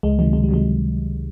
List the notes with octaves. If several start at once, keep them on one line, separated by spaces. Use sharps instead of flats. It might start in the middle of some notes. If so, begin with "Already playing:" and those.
C#2 G#3
C3 D#3 F#3 G#3
C#2 G#3
G3
C3 D#3 F#3 G#3